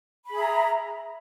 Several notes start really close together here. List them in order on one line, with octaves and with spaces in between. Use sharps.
B5 G#4 E5 A#5